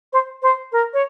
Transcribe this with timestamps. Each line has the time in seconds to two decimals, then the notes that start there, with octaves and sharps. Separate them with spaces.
0.13 C5
0.43 C5
0.72 A#4
0.94 C#5